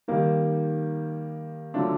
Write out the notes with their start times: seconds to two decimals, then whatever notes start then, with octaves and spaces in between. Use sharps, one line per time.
0.08 D#3 G3 A#3 D#4
1.74 D3 F#3 A3 D4 F4